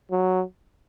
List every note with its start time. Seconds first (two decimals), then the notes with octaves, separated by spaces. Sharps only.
0.11 F#3